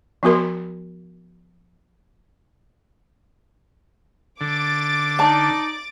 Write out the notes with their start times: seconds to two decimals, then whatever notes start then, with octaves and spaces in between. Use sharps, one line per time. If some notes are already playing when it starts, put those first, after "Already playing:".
0.23 F3 B3 F#4 A#4 C6
4.41 D3 D6 A6
5.19 D#4 D5 A5